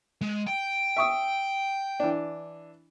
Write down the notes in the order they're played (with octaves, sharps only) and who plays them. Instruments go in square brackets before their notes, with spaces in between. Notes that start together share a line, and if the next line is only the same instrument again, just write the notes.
[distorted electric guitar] G#3
G5
[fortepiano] E5 C#6 D#6
E3 D4